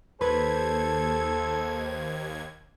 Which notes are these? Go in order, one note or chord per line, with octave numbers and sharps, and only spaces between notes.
D#2 A4 B4 C5 G#6